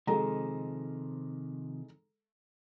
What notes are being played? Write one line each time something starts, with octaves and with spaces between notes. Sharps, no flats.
C3 D#3 F3 G#3 A4 A#5